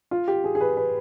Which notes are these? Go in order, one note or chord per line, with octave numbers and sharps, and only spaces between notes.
F4
G4
G#4
G#4
B4
B4